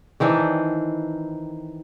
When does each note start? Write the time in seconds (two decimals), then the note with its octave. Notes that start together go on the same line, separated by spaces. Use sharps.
0.20 D#3 E3 C4 D4